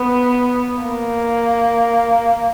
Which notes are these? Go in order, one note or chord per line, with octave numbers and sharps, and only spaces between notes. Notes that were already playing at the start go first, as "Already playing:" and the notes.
Already playing: B3
A#3